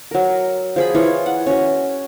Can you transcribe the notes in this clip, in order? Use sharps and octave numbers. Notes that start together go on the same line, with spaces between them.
F#3 A#4
F3 G#4 B5
E3 F4 C#5
F#5
C#4 F#4